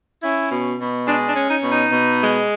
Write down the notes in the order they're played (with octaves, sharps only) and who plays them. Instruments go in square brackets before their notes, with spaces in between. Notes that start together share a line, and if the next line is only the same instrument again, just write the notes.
[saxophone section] C#4 E4
B2
B2
G#3 D4
D4
C#4
D#4
B2
D#4
B2
G#3